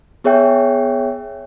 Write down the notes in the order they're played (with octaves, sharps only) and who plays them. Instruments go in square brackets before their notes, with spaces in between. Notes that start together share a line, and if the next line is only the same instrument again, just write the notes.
[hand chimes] B3 G#4 C#5 E5 G5